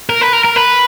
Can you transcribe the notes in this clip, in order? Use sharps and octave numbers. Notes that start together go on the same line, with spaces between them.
A#4
B4
A#4
A#4
B4